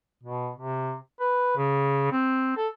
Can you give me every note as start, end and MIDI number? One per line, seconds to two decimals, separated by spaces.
0.23 0.50 47
0.56 0.95 48
1.20 1.56 71
1.57 2.12 49
2.12 2.55 60
2.57 2.68 69